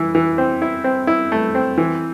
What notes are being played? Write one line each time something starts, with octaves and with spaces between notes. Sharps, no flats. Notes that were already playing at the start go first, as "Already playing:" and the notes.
Already playing: E3 E4
E3
C4
E4
C4
E4
A3
C4
E3